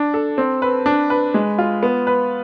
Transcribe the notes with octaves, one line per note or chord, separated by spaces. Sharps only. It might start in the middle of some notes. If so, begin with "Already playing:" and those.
Already playing: D4
A4
C4
B4
D4
B4
G#3
F4
B3
B4